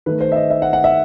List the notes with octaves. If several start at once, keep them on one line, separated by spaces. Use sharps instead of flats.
D#3 A3 B4
C5
E5
D#5
E5
F#5
F#5
E5